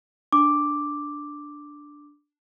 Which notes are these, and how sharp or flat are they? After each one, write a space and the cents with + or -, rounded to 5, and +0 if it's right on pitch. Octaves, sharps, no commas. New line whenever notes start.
D4 +0 D6 +0